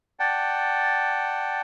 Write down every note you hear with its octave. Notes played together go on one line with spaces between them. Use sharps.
D5 F#5 G5 A5